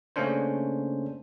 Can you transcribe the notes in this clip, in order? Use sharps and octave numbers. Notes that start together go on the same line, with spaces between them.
C#3 A3 A#3 C#4 D4 C5